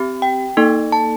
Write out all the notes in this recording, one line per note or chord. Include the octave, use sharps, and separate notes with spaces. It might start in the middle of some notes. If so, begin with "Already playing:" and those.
Already playing: C4 G4
G5
A#3 D#4 A4
A5